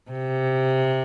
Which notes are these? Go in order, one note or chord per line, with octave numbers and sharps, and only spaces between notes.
C3